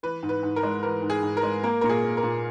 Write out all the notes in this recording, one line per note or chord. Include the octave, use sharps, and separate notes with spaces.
E3 B4
G#2
B4
G#2
A#4
G#3
E3 A#4
G#2
G#4
G#2
A#4
G#3
A#3 A#4
A#2 A#4
G#4
A#3
A#4
A#2